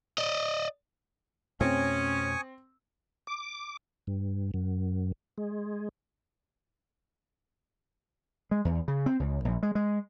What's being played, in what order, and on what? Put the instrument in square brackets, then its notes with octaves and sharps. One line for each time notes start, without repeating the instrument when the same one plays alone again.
[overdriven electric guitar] D5 D#5
[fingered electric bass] F2 B2 A3 [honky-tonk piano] C4 [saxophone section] C#4 [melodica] G#5 C#6 D#6
[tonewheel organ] D6
G2
F#2
G#3
[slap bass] G#3
E2
C#3
C4
C#2
A#1
G#3
G#3